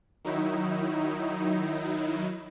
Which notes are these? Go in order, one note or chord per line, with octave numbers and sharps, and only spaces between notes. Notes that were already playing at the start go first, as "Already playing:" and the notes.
D#3 F#3 D#4 E4